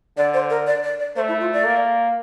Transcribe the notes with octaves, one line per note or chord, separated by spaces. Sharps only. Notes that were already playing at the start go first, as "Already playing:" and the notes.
D3 D5
C5
A#4
D5
D5
D5
A3 C5
E4
F4
D5
A#3